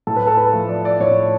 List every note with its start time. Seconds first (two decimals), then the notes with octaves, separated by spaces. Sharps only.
0.07 A2 A4
0.16 B4
0.27 A4
0.37 B4
0.53 F3 A3
0.69 D5
0.85 D5
1.00 A2 C#5